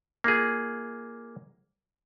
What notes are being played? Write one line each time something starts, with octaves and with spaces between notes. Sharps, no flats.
A#3 D#4 F4 G#4